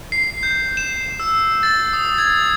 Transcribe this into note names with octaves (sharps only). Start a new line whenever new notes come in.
C7
G6
E7
E6
A6
D#6
G#6